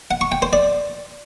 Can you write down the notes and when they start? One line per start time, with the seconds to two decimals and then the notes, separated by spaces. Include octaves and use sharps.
0.11 F#5
0.21 C#6
0.32 G5
0.42 C5
0.53 D5